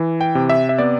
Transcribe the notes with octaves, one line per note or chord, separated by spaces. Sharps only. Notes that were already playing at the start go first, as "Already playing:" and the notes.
Already playing: E3
G5
C3
E5
E5
B3 D5